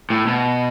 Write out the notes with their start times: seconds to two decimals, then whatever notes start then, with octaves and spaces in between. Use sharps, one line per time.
0.10 A2
0.27 B2